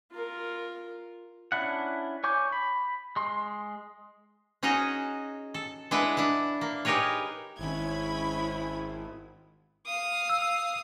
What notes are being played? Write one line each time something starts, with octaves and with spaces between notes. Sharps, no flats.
F4 A#4
C#4 D4 E4 F#5
C#5 G#5 C#6 D6 G6
B5
G#3 C6
C#4 D#4 F#4 G#4 D#5 A#5
A4
G#3 D4 E4 B4 F#5
D4 E4
A#3
D#4 G4 G#4 A#4 B4 C#5
G#1 D#3 G#3 C#4 E4 B5 G#6
F5 D#6
E6